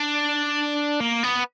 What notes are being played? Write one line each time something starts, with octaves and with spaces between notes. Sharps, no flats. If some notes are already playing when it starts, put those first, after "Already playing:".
Already playing: D4
A#3
B3